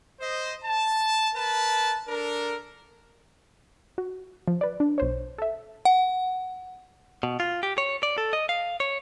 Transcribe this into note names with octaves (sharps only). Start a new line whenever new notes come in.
C5 D#5
A5
A#4 B4 A5
D4 A4 A#4
F#4
F3
B4 D5
D4
B1 C5 C#5
A4 E5
F#5
B2
F4
G4
C#5
D5
A4
D#5
F5
C#5